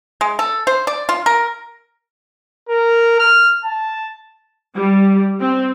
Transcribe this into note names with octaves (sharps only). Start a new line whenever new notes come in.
G#3
A4
C5
D5
F4
A#4
A#4
F6
A5
G3
C4